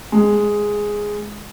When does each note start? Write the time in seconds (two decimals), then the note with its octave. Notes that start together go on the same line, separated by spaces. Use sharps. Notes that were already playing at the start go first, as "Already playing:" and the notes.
0.12 G#3